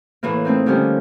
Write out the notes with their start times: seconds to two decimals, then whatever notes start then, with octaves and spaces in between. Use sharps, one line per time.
0.23 A2 E3 A#3
0.45 A3 C4 D#4
0.66 D3 D#3 F3 G3 C#4